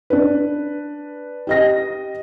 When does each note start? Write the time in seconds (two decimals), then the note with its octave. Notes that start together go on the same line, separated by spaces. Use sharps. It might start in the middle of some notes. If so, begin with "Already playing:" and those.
0.10 D4 B4
1.47 G4 D#5 A#6